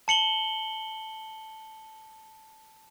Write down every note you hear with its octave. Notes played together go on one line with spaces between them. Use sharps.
A5 C#7 F#7 G7